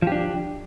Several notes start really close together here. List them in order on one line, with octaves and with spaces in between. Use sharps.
F3 G4 D4